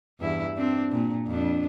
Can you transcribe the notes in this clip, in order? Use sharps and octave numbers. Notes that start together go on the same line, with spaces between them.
E2 G2 E4
C4 D4
A#2
F2 D4